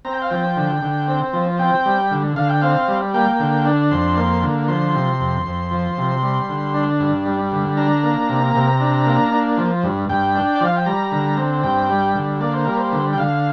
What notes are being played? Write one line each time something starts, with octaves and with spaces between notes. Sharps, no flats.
C4 A#5
G5
F5
F3 G5
D3
D3
C4
F3
C4 G5
G3
D3
D3 F5
G5
C4 F5
G3
A#3 G5
D3
D4
F2 C6
A#3
D3
F3 C6
C3
F2
F2
F3
C3
G3
D3
D4
G2
G3
D3
D4 A#5
A#3
C3
C3
D4
A#3
D4
F3
G2
G2 G5
D4
D5
F3 F5
G5
G3 A#5
D3
C4
G2 G5
G3
D3
A#3 D5
C5
G3 A#4
C5
D3
G5
D3 F5